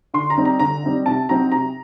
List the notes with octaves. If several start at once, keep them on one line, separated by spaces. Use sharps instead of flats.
D3 C6
A#5
G3 C4 D#4
A#5
D3 A#5
G3 C4 D#4
C3 A5
F#3 C4 D#4 A#5
C3 A#5